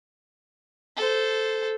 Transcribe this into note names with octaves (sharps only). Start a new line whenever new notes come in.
A4 C5